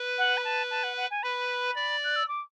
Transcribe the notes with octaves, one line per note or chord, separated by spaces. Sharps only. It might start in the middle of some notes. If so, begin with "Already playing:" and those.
Already playing: B4
F#5
B5
A5
A5
F#5
F#5
G#5
B4 B5
D5
F#6
E6
D6